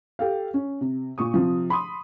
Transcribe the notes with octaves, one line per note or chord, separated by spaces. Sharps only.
G4 A4 F5
C#4
C3
A#2 C#6 D#6
C3 F3
B5 C6 D#6